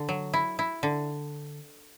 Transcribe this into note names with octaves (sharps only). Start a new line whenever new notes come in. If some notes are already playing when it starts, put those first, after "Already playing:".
Already playing: D3
F#3
E4
E4
D3